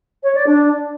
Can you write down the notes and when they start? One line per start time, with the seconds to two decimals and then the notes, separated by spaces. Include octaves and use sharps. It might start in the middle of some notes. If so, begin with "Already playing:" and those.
0.23 C#5
0.35 D5
0.47 D4